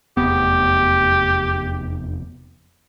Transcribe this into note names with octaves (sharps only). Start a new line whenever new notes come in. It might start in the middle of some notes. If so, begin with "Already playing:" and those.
F1 E2 B3 G4